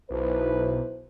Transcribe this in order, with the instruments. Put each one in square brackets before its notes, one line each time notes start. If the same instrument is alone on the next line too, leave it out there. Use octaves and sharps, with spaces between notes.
[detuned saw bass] B1 [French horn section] E4 B4 C5